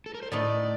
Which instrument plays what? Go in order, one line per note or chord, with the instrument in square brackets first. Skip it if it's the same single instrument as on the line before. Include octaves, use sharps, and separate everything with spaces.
[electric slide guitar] A4
A#4
C5
[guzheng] A2 A3 D#4 [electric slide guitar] D5